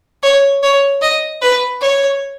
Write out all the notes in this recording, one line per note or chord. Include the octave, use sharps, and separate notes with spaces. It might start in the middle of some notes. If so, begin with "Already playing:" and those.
C#5
C#5
D#5
B4
C#5